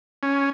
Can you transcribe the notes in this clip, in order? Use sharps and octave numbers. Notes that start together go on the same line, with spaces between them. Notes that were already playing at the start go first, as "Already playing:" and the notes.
C#4